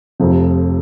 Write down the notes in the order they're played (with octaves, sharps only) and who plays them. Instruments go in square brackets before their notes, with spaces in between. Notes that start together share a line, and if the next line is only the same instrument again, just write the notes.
[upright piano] F1 F2 C3 F3